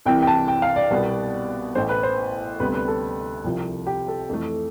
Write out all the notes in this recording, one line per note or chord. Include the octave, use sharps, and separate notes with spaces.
C2 C3 E3 G5
G5
A5
G5
F5
D5
C2 B2 G3 B3
A1 A2 E3 C5
B4
C5
D2 C3 G3 B3 B4
B4
A4
C2 C3 F3
G4
A4
F2 E3 A3